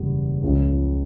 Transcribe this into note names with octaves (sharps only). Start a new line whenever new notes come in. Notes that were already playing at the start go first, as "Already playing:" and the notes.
Already playing: F#1 E2 B2 G3
C#2 C#3 F3